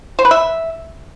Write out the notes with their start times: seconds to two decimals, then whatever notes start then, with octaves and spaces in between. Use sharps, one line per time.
0.19 C5
0.25 B4
0.31 E5